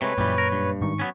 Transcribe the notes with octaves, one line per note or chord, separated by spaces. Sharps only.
C3 G#3 A3 B4 C#5
F#2 A#2 E3 G3
A#4
G2
G#2 D#3 C#6
F#3 B3 C#4